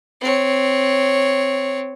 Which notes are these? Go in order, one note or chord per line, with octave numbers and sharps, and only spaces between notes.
C4 C#5